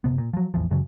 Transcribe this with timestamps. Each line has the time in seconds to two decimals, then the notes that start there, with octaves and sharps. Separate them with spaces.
0.04 F#1 F#2 C3 B3
0.18 A#2
0.33 F3 F#3
0.54 A1 E2 E3 F3
0.71 F#2 C#3 E3 F#3